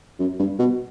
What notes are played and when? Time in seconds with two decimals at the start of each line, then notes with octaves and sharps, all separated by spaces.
0.20 F#2
0.39 G2
0.59 B2